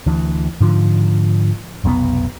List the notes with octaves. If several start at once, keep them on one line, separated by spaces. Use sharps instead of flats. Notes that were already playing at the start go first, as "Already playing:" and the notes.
D2 E3
G#2 D3 F3
F1 B1 A#2 B3